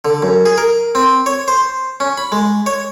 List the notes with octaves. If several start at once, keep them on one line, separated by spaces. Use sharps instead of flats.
D3
F#2
G#4
A#4
C4
C#5
C5
C#4
B5
G#3
C#5